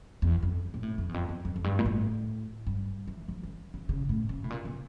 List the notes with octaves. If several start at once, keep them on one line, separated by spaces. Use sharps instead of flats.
E2
F2
A#2
A2
F2
E2
F2
E2
F2
F2
G2
A#2
A2
G2
E3
F3
E3
D3
C#3
A2
C#3
A2
A#2
C#3